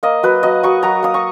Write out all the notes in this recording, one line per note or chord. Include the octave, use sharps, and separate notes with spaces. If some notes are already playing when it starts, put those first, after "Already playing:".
A#3 D#5
F#3 B4
F#3 D#5
F#3 C#6
F#3 A#5
A#3 D#6
C#6